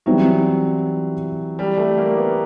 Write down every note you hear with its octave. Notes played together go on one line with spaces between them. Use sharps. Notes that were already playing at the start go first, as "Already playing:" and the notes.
E3 F#3 G3 C4 E4
G3
A3
A#3
A#3
B3